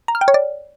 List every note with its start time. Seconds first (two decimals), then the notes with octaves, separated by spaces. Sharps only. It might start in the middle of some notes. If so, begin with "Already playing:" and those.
0.08 A#5
0.15 F6
0.21 G5
0.28 C#5
0.34 D5